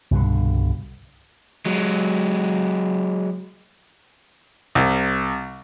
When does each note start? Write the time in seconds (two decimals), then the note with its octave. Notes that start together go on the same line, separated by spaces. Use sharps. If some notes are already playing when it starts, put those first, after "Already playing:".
0.11 C2 G2 B2 D3
1.66 F#3 G#3
4.75 C2